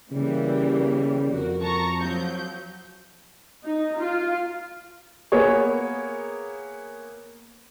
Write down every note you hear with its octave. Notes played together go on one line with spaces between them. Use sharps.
C#3 E3 G3 A#3
F2 F#4 A#4
A5 A#5 C#6
F3 F#3 G6
D#4
F4
A#3 B3 G#4 C#5